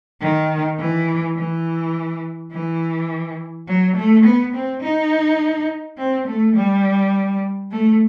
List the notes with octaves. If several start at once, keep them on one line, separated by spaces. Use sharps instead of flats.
D#3
E3
E3
E3
F#3
A3
B3
C4
D#4
C4
A3
G3
A3